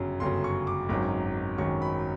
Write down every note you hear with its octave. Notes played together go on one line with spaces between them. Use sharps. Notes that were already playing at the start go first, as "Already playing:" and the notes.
Already playing: G1 F#2 C#3 F#3
G1 F#2 C#3 F#3 C6
C#6
D6
G#1 F#2 D#3 F#3 D6
G#1 F#2 D#3 F#3 C#6
B5